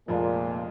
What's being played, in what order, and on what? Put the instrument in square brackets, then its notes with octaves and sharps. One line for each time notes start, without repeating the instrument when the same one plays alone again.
[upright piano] F1 F2 F3 G#3 [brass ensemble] A#2